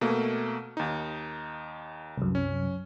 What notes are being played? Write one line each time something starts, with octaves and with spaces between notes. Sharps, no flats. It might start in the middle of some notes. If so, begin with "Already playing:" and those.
B2 A3 A#3
D#2 D#4
C2 F#2
C#4